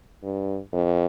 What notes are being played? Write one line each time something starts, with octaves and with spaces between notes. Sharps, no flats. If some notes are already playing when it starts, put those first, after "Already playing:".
G2
F2